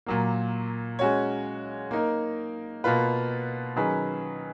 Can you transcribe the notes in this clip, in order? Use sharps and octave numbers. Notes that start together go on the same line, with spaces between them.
A#2 F#3 A#3
G#3 C#4 F#4 C#5
A#3 D#4 A#4
B2 A#3 F4 B4
D#3 F#3 C#4 G#4 B4